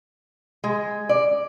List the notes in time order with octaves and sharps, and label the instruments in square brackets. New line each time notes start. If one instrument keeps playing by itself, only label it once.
[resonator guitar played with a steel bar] G#3
D5